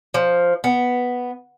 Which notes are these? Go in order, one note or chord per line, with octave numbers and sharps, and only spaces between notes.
F3
B3